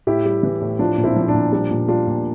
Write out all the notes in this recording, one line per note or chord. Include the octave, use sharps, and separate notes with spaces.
A2 E4 G4
G3
E3
A2
F3 D4 F4
A#2
C4 E4
F3
D4
A#2
G3 D4
A#2
G3 D4 F4
A#2